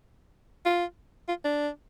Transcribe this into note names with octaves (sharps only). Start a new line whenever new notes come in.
F4
F4
D4